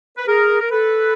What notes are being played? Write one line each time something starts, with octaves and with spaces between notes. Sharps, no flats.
B4
G#4 A#4
A#4
A4 B4